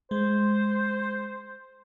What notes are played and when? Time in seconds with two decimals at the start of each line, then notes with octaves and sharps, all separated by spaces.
0.11 G#3 C5